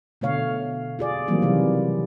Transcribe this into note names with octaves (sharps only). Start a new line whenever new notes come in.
B2 D3 A3 C#5 F5
F4 G#4 D5
D#3 E3 F#3 G3 A#3 C4
C3 E3 G3